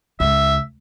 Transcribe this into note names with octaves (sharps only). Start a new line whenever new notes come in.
C#2 E5